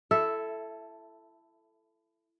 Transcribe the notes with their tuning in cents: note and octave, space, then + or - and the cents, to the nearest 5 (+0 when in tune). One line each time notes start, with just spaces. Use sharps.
E4 +25 A4 +0 E5 +0